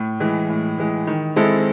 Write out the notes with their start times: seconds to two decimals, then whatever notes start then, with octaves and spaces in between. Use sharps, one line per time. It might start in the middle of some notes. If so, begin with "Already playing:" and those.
Already playing: A2
0.20 E3 G#3
0.49 A2
0.79 E3 G#3
1.07 D#3
1.36 G#3 C4 E4 A4